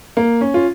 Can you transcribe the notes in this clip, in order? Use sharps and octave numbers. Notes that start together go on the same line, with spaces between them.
A#3
C#4
F4